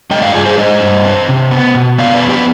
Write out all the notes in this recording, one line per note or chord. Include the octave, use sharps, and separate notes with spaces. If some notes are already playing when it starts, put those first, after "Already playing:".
G#3 D#5 G5
D5 F5
G2 F4 G#4
G#4 C5
G#3 C5 D#5
G2
C4
C3
B3
B2
B3 D5 F5
B4 D5
F2
G4 B4